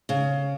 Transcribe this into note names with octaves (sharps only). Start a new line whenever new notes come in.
C#3